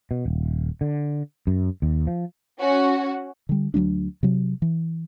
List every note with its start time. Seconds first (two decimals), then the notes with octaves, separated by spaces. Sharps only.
0.11 B2
0.26 D#1
0.81 D3
1.47 F#2
1.82 D#2
2.07 F3
2.60 C#4 F#4
3.49 D3 G3
3.74 D2 F#3 A3 D4
4.23 C3 F#3
4.62 E3